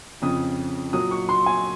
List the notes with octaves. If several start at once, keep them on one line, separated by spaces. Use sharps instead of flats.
F2 C#3 F3 D#6
A#2 F#3 D#6
C#6
C6
G#5